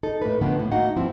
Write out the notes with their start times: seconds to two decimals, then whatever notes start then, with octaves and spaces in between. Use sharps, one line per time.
0.03 D#4 A4
0.22 A2 A#3 D#4 B4
0.41 A2 D3 D#3 F3 A#3 B3
0.59 A2
0.72 A3 A#3 D#4 F#4 D#5 F#5
0.96 G2 F3 C4 E4